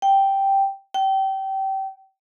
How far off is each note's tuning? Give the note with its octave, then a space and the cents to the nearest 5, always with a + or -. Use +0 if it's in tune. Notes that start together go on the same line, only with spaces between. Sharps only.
G5 -5
G5 -25